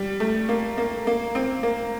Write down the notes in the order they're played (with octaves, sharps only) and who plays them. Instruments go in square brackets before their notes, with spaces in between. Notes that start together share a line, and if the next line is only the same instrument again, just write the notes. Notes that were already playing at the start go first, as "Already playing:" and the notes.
Already playing: [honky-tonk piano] G3
A3
A#3
A#3
A#3
C4
A#3